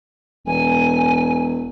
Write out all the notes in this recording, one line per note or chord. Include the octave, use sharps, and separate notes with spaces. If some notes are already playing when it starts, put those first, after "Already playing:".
E1 G#5